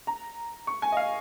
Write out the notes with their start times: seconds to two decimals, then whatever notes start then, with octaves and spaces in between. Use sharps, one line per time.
0.07 A#5
0.67 C#6
0.82 G#5
0.92 D#5
0.97 F5